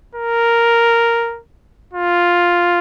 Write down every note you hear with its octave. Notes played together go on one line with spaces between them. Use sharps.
A#4
F4